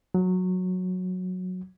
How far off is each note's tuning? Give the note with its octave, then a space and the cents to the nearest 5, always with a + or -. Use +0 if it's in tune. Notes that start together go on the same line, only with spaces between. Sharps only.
F#3 -15